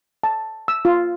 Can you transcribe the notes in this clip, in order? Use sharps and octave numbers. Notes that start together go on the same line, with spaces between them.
A5
E6
F4